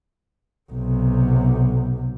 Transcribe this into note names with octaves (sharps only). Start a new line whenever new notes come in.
B1 C3